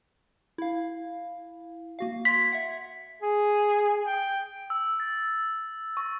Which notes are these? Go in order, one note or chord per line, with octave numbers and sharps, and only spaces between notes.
E4 F5
A#3 F#4 F5
C6 G#6 B6
E5 F#5
G#4
G5
E6
A6
C#6